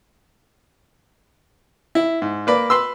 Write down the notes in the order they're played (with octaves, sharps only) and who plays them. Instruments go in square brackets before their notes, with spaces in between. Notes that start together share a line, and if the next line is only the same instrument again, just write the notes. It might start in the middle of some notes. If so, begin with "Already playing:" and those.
[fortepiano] E4
G#2
A#3 B4 D5
B4 C6 E6